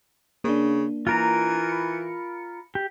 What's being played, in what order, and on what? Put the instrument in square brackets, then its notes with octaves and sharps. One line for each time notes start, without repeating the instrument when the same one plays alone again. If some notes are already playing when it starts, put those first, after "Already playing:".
[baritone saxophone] C#3 [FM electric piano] A#3 D4
[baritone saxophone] E3 [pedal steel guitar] F4 A#4 A#5
[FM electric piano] B5 C#7
[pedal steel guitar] G4